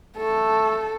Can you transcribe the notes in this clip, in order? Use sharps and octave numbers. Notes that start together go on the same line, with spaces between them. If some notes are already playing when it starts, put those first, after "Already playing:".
A3 A4